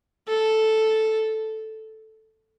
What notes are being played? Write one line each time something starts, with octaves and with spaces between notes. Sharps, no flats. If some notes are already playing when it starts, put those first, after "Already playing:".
A4